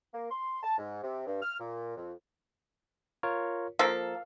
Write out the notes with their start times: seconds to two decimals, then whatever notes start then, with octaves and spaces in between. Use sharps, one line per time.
0.14 A#3
0.31 C6
0.63 A5
0.78 G#2
1.03 C3
1.27 G2
1.42 F6
1.59 A#2
1.96 F2
3.23 F4 A#4 C#5
3.79 F3 A#3 A4 F5